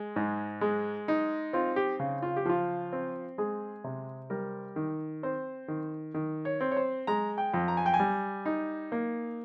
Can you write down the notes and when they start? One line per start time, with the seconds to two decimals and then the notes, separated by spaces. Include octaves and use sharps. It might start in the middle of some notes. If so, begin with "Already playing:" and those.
Already playing: G#3
0.16 G#2
0.61 G#3
1.08 D#4
1.53 C4 F4
1.76 G4
2.00 C#3
2.22 F4
2.36 G4
2.45 F3 F4
2.93 C4
3.38 G#3 G#4
3.84 C3
4.30 G3 A#4
4.76 D#3
5.23 C4 C5
5.68 D#3
6.14 D#3
6.45 C#5
6.61 C4
6.71 C#5
6.77 C5
7.07 G#3 A#5
7.38 G5
7.54 F2
7.68 A#5
7.77 G#5
7.86 G5
7.94 G#5
8.00 G3
8.46 D#4
8.92 A#3